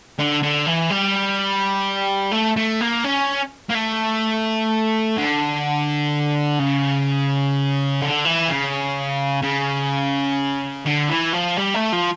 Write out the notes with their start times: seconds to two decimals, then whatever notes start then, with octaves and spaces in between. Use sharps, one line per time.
0.19 D3
0.43 D3
0.67 E3
0.90 G3
2.32 A3
2.57 A3
2.80 A#3
3.04 C#4
3.70 A#3
3.75 A3
5.17 D3
6.59 C#3
8.02 D3
8.25 E3
8.49 C#3
9.43 C#3
10.86 D3
11.09 E3
11.33 F3
11.57 G3
11.74 A3
11.92 F3